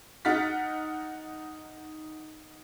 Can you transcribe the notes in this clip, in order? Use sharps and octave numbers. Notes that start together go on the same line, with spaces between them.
D#4 F#5 F6 A6 B6